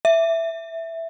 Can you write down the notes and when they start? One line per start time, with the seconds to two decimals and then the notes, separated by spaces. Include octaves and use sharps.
0.05 E5